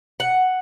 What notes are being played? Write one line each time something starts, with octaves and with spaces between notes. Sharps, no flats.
F#5